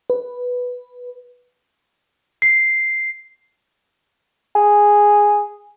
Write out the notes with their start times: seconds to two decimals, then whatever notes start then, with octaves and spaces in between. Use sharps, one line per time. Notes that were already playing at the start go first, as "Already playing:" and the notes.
0.10 B4
2.42 C7
4.55 G#4